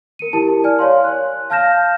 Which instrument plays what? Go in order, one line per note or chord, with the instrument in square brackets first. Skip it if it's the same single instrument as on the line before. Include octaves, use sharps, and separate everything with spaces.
[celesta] A#4 C#7 D#7
E4 G4 A#4 A5
D5 G#5 F6
C#5 D5 F5 C6
F#6
F5 A5 F6 G6 A#6 E7